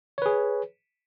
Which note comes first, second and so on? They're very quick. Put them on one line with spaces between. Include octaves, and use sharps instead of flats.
C#5 B4 G#4